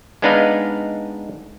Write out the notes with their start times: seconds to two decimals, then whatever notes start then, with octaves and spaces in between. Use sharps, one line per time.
0.22 G#3 B3 D4 D#4 B4 F5